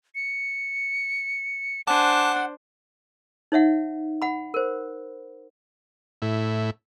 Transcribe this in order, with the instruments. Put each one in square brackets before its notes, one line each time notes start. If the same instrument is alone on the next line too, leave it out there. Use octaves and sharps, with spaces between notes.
[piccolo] C#7
[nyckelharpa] D4 C5 [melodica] F#5 [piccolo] G#5 [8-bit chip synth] A5 D6
[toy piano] D#4 C#5 E5 F#5
F#5 B5
A#4 C5
[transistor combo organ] A2 E4